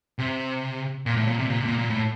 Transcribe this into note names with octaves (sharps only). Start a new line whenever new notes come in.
C3
A#2
A2
A#2
C3
A#2
C3
A#2
A#2
A2